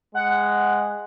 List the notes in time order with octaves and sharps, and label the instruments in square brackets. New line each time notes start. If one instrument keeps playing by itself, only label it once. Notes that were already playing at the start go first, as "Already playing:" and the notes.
[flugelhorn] G#3 [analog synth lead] F#5